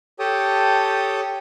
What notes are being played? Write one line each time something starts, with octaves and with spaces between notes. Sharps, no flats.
G4 A4 C#5 G5 A5 D#6